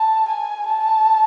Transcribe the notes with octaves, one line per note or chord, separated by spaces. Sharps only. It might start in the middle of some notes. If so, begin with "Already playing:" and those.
Already playing: A5
G#5
A5